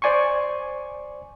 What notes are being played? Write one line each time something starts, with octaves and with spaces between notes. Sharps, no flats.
C5 D5 G#5 C6 C#6